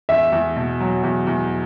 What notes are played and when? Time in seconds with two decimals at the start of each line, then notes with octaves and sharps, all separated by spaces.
0.09 E2 E5
0.32 E2
0.56 B2
0.80 F#3
1.03 E2
1.27 E2